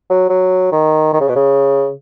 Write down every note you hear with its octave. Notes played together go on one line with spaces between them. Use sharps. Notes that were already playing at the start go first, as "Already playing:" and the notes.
F#3
F#3
D#3
D#3
C#3
B2
C#3